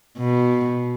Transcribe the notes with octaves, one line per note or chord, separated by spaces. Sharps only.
B2